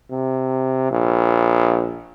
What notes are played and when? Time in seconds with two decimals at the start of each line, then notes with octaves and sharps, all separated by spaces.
0.11 C3
0.91 A#1